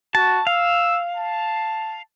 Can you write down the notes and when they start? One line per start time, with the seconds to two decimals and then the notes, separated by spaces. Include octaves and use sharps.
0.15 F#4 A5
0.47 F5 E6
1.16 A5